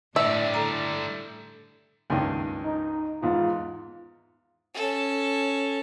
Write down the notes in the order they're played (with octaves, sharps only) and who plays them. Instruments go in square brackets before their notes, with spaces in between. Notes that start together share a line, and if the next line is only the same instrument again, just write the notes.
[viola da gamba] A2 D4 E4 [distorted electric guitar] D3 G3 [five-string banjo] E5
[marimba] A4 A#5
[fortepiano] C#2 G2 D#3
[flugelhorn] D#4
[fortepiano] E2 G#2 [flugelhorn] F4
[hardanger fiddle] C#4 A4